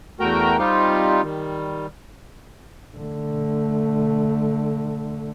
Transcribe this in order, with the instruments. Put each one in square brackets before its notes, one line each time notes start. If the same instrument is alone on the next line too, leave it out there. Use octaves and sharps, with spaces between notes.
[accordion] E2 A3 F#4 A#4 G5 A#5
G3 C4 D#4 F4 G4
D#3 G3
[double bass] D3 A3